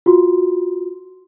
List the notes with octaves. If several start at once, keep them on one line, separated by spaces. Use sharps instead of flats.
F4 F#4 C6